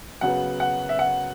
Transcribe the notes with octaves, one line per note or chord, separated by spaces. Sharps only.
F#2 C#3 F#3 B3 F#5
F#5
E5
F#5